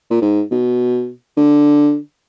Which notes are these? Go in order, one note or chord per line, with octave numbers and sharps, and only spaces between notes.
A#2
G#2
B2
D3